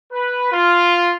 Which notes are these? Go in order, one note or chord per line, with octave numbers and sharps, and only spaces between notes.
B4
F4